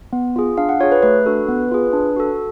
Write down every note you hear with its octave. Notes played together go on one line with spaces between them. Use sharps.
B3
F4 G#4
D4 F5
F#5
F4 G#4 C#5
B4
A3 B4
D4 F#4 A4
B3
F4 G#4
D4
F#4 A4